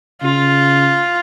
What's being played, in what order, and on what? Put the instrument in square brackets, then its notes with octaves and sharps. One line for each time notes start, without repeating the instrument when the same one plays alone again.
[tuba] C#3 [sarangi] F4